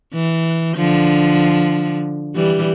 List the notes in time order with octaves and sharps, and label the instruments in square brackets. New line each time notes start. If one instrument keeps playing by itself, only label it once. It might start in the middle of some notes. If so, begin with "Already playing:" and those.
[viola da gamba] E3
D3 F3
E3 G3